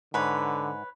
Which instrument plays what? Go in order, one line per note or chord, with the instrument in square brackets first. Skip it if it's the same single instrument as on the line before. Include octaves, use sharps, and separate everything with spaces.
[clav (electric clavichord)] G#2 [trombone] D3 [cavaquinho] B4 C#5